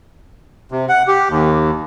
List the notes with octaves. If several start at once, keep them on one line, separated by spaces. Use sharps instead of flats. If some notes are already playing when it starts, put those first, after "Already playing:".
C3
F#5
G4
D#2